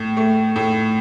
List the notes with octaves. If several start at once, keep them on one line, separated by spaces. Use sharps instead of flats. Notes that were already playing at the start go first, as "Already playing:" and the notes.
Already playing: A2
A3
A2